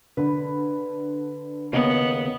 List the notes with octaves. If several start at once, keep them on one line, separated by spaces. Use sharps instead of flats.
D3 B4
D#2 C#3 B3 D#5